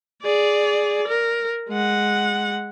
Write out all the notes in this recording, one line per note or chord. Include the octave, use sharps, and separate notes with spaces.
G#4 D5
A#4
G#3 F#5